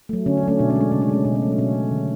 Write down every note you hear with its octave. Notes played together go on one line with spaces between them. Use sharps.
F#3 A3
D3 C#4
D4
F#3 A3 C#4
B2 D4
C#4
G#3 D4
C#3 C#4
D4
G#3 C#4
B2 D4
C#4
F#3 A3
D4
B2 C#4
A3
D3